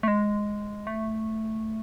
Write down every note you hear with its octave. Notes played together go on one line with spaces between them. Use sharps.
A3
G#3
A3